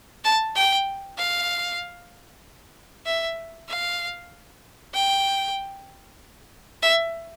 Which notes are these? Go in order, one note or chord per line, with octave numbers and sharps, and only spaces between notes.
A5
G5
F5
E5
F5
G5
E5